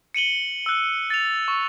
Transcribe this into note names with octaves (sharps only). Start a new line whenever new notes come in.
C#7 D#7 F#7 G7
E6 F#6
A6 F7
C#6